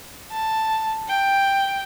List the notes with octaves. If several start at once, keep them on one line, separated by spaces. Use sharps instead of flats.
A5
G5